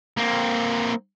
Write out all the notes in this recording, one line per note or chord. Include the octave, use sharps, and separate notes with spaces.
A#3 C4